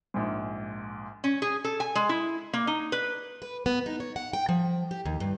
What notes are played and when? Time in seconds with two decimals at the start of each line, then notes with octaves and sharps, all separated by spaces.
0.14 A#1 G#2
1.24 C#4
1.42 G#4
1.64 A4
1.80 G#5
1.95 G#3
2.09 E4
2.53 A#3
2.67 D#4
2.92 B4
3.42 B4
3.66 B3
3.86 D#4
4.00 C#5
4.16 F#5
4.33 G5
4.49 F3
4.91 G4
5.06 D#2
5.20 G2